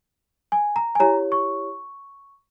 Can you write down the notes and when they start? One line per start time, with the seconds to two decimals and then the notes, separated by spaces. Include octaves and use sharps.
0.52 G#5
0.76 A#5
0.95 G#5
1.00 E4 G4 C#5 A#5
1.32 C#6